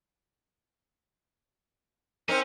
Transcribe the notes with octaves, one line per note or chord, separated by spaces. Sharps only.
C4 C#4 D#4 A#4 C5